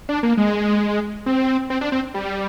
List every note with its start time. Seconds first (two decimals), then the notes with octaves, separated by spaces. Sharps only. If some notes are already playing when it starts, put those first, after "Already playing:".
0.09 D4
0.23 A#3
0.38 G#3
1.26 C4
1.70 C4
1.81 D4
1.92 C4
2.14 G3